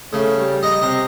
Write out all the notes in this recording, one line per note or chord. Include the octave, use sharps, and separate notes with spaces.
C#3 A3
G3
D#5 A#5
C3 D#5